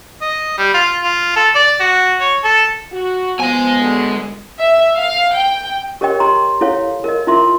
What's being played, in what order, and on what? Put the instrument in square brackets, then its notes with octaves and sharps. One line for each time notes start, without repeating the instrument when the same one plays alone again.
[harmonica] D#5
G3
F4
F4
A4
D5
F#4
C#5
A4
[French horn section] F#4
[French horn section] F3 [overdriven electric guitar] G#3 G#5 [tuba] B3
[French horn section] F#2 B2 D3
[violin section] E5
F5
G5
[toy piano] G4 A#4 C#5 D#5 G5
G4 D#5 A#5 C6
E4 A4 C#5 F5
A#4 D#5
E4 F4 A#4 E5 C6